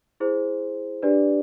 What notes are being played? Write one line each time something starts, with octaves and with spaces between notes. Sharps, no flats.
E4 G#4 C5
D4 G4 B4 D5